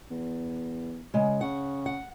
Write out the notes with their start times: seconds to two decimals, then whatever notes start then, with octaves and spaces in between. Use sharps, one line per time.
0.11 E2
1.14 C#3 G#3
1.41 C#3 F#5
1.86 F#5